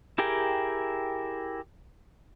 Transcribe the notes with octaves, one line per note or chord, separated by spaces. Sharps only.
E4 G4 G#4 A#4 G5